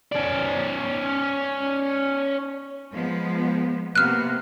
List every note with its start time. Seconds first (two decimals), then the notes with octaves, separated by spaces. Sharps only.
0.12 C#4 D5
2.94 F3 G#3 B3
3.95 C3 A#3 B3 F6 F#6